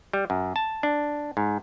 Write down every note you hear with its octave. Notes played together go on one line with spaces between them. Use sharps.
G3
F#2
A5
D4
G#2